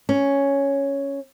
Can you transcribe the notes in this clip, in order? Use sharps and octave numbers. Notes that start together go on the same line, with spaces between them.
C#4